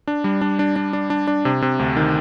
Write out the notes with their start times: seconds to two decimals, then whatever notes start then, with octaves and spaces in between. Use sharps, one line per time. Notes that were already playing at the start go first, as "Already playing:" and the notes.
0.07 D4
0.24 G3
0.41 D4
0.59 D4
0.76 D4
0.93 D4
1.10 D4
1.27 D4
1.45 C3
1.62 C3
1.79 D2
1.97 D#3